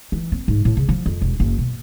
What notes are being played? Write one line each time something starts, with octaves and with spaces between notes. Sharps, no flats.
E3
C4
G#2
A2
C#3
F3
F2
E1
F#1
B2